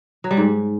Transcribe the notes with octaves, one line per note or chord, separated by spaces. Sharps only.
F#3
G3
G#2